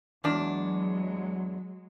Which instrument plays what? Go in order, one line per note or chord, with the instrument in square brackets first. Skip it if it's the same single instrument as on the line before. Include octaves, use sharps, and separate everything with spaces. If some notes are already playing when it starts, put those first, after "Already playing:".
[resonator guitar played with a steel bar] E2 D4 [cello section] F#3 G#3